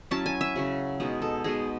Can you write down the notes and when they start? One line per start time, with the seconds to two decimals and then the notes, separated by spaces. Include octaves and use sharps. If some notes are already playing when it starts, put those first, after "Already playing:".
0.11 F#3 C#4 E4 A5
0.26 G#5
0.41 E5
0.56 C#3 F#3 C#4
1.00 B2 G#3 D#4
1.22 A4
1.44 B2 G#3 D#4 G#4